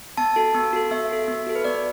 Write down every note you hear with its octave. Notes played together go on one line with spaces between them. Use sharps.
B3 A5
F#4 A4
B3
F#4 A4
B3 E5
F#4 A4
B3
F#4 A4
B4
B3 D5